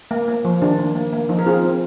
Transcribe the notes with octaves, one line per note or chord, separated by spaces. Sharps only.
A#3
A#3
F3
D#3 D4
A#3
A#3
A#3
F3 D#4
A#4
C4 F4 G#4
C4